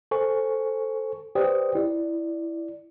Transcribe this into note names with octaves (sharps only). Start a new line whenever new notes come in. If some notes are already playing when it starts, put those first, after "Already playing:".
A4 C5 G#5 C#6
G4 B4 C5 D5 G5 D#6
E4 D5